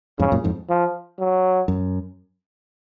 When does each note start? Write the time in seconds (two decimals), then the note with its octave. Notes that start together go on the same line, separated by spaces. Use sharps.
0.19 F2 G#2 C#3
0.32 F#2 A#2
0.44 F2 G#2
0.69 F3
1.19 F#3
1.68 F#2